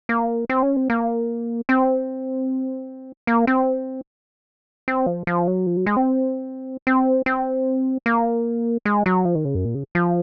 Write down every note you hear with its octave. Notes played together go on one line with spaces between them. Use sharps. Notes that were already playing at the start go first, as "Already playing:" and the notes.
A#3
C4
C#4
C4
A#3
C4
A#3
C4
C4
F3
F3
F#3
F3
F#3
G#3
C4
C4
C4
A#3
G#3
F#3
F3
D#3
C#3
F#2
A#2
C#3
F3